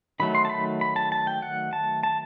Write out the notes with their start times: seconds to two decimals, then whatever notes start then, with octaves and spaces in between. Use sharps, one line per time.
0.20 D#3 F#3 A3 B5
0.35 C6
0.45 A5
0.50 B5
0.81 B5
0.96 A5
1.12 A5
1.27 G5
1.42 F#5
1.73 A5
2.03 A5